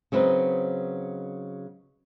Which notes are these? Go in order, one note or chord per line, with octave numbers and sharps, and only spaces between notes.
C#3 F#3 C4 D#4 B4